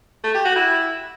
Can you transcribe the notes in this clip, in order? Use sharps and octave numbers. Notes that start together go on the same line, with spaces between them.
A3
G4
F#4
E4